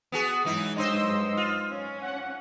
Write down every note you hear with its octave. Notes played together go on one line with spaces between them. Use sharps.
B3 F#4 G#4
G#2 E3 F#3 D#4 E4
G2 D#4 C5 D#5 C6 E6
F4
C#4
F#5